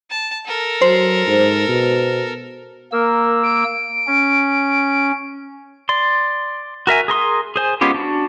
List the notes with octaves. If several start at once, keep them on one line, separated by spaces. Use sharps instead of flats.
A5
A4 A#4
F#3 C5
G#2
B2
A#3 A#4 E6
D7
C#4
D5 C6
F#4 A#4 E5 G#5
G#4 A#4 C6 D#6
G#4 C5 G#5
G#3 B3 C#4 F4 G4
D4 F#4